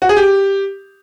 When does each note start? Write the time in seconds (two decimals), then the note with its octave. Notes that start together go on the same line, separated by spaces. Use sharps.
0.02 F#4
0.09 G#4
0.17 G4